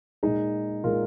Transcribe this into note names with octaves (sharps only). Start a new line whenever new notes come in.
A#2 G#3 D#4 G#4
A#2 G#3 F4 A#4